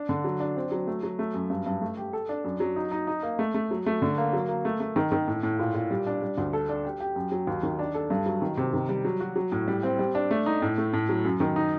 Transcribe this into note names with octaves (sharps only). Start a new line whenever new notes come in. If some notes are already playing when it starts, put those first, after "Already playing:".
Already playing: D4
D3
F#3
D4
C4
F#3
A3
F#3
A3
F#2
G2
G2
A3
G4
A4
D4
F#2
F#3
D#4
D#4
D#4
A#3
A3
A3
F#3
A3
D3
A#3
F#3
A#3
A3
A3
D#3
D#3
A2
A2
A#2
A#2
G3
D4
G3
D2
A4
D4
G4
G4
F#2
F#3
D#2
D#3
D4
A4
G2
F#3
D#3
C3
D#3
G3
F#3
F#4
F#3
A2
G3
C4
G3
D4
A3
D#4
A2
A3
A2
F#3
F#2
D#3
D#4